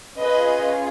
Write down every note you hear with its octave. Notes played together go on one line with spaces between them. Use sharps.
C#4 F4 G#4 B4 D#5